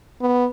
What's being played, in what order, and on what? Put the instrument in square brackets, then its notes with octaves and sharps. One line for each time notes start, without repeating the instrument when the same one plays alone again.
[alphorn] B3